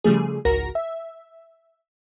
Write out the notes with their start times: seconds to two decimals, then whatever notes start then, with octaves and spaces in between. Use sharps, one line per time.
0.04 C#3 F3 G3 A3 G#4
0.45 G#1 C#2 F#4 A#4 A#6
0.75 E5